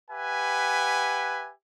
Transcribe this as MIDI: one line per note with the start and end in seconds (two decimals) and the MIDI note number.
0.11 1.51 67
0.11 1.51 71
0.11 1.51 76
0.11 1.51 78
0.11 1.51 80